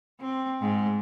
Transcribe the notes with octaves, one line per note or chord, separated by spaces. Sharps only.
C4
G#2